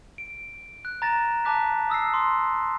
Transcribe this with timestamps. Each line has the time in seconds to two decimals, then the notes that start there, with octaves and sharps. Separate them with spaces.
0.18 D7
0.85 F#6
1.02 A#5 A6 A#6 E7
1.45 A5 A#5 D6 F#6 B6
1.90 D#6 E6 A#6 C7
2.14 C6